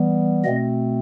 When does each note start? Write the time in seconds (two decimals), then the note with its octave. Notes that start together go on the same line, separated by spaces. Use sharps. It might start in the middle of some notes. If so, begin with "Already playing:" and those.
Already playing: E3 G3 B3
0.44 B2 A3 C4 D#5